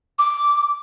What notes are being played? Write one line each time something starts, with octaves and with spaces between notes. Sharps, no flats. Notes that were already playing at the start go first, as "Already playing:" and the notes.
D6